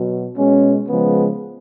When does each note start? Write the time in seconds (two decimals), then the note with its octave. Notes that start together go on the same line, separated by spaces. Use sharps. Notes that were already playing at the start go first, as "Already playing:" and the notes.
Already playing: B2 F#3
0.38 B2 G#3 C#4
0.89 C#3 F3 G#3 B3